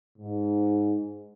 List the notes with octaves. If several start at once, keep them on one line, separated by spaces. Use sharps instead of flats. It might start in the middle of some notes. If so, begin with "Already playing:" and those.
G#2